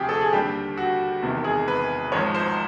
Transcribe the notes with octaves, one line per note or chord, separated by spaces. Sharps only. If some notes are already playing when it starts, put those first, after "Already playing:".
Already playing: D2 C3 F3 G4 G#4
A4
G#4
D#2 D3 G3 G4
F#4
E1 E2 C3 D#3
G#4
B4
G#1 G#2 F3 C#5
C5